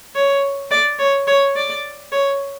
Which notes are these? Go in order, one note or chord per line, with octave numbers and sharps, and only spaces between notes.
C#5
D5
C#5
C#5
D5
C#5